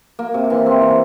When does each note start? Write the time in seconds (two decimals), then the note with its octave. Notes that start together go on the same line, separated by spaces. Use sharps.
0.19 A#3
0.34 C3
0.50 E3
0.66 C4
0.82 E3